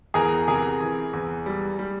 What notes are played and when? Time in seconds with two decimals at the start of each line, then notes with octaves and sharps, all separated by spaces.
0.14 E2 G#4 A#4
0.47 C3 G#4 A#4
0.80 E3
1.13 E2
1.46 G3
1.79 G3